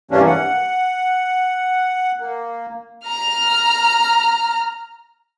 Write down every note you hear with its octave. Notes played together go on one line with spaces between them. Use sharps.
G2 C3 E3 A#3 C#4 D4
F#5
A#3
A#5 F6